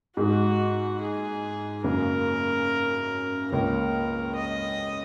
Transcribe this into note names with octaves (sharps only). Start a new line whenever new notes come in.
G#2 G#3 D#4 F#4
G#4
F#2 C#3 F#3 A#3 A#4
C#2 C#3 A#3 C#4 A#4
D#5